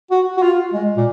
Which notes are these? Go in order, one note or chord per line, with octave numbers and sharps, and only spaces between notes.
F#4
F#4
F4
G#3
A#2